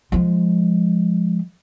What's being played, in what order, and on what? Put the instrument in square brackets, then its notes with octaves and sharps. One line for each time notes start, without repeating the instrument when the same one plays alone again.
[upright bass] F3 G#3